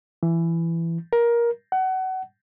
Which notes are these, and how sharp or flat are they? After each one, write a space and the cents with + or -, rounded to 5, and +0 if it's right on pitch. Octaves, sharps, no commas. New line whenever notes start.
E3 +15
A#4 +15
F#5 +25